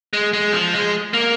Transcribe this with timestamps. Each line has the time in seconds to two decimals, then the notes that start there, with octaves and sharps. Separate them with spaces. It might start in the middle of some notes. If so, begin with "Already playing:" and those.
0.13 G#3
0.33 G#3
0.53 F3
0.74 G#3
1.13 A#3